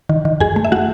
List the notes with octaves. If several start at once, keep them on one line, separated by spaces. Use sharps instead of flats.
D#3
D#3
F#2 G#4 G#5
A3
E5
A3 F#4 F#5